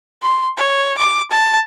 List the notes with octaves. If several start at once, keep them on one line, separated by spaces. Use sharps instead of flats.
C6
C#5
D6
A5